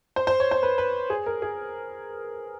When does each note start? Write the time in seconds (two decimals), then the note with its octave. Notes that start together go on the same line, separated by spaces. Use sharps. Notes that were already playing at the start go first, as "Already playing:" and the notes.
0.16 C5
0.27 C5
0.40 C#5
0.51 C5
0.63 B4
0.78 B4
1.10 G#4
1.26 A#4
1.42 G#4